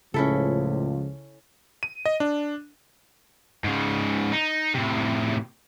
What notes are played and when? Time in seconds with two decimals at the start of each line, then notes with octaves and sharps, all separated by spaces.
0.14 C#2 A2 C#3 F3 C#4 E4 A4
1.83 D#7
2.06 D#5
2.20 D4
3.65 G#2 C#3
4.32 D#4
4.74 A2 C3